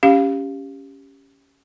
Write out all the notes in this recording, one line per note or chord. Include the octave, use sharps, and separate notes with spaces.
C#4 G4 F5